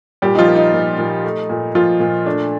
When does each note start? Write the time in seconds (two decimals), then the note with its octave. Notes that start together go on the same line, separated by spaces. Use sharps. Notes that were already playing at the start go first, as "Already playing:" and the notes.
0.22 A#2 G3 G4
0.35 D#4
0.39 F3 F4
0.48 A#3
0.56 D#4
0.73 A#2
0.98 A#2
1.24 A3
1.49 A#2
1.75 A#2 F3 F4
2.00 A#2
2.25 A3 D4